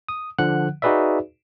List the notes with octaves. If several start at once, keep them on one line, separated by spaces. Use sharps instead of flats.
D#6
D3 F3 F#5 F#6
D#4 F#4 G#4 B4 D5 E5